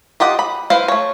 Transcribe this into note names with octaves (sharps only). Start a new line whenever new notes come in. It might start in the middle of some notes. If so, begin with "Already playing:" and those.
F4 G4 D#5 F#5
B5
E4 B4 C5 F5
A3 C#5